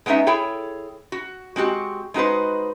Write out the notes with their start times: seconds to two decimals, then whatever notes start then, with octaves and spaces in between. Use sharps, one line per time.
0.06 G#3 B3 C#4 D#4 E5
0.27 E4 G#4 A4 C#5 G5
1.12 F#4
1.56 G#3 C4 F#4 G4
2.14 G#3 D#4 F#4 B4 C5